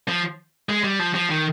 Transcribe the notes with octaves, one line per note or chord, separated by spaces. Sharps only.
F3
G#3
G3
F3
F3
D#3